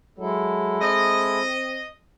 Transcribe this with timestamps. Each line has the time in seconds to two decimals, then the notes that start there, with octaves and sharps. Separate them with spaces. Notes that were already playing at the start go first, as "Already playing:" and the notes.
0.18 F#3 G#3 E4 A4
0.81 C4 D#5